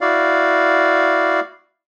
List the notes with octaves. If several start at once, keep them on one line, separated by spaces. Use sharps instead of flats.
E4 F#4 D5 F5